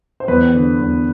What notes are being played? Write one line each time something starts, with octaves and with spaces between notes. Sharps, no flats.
C5
E2 B4
D3
E2